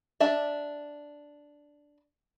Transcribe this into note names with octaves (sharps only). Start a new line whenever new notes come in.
D4 D5 E5